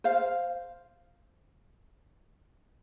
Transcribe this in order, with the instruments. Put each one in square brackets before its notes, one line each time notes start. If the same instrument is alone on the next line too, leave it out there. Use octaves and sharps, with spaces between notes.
[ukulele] C5 F5